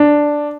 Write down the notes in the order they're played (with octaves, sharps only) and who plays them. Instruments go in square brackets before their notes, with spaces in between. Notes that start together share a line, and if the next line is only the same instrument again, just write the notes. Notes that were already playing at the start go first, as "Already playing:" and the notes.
Already playing: [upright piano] D4